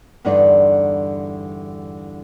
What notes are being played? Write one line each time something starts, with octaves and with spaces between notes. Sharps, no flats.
E2 G2 D3 D#4 D5